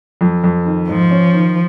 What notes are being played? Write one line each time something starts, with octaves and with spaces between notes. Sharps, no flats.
F2
F2
D#3
G#2 F3
C#4
D#3